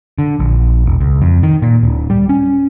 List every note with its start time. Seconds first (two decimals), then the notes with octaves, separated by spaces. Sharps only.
0.19 D3
0.40 A#1
0.86 E1
1.00 C#2
1.22 F2
1.43 D#3
1.62 A#2
1.83 D1
2.10 G3
2.29 C#4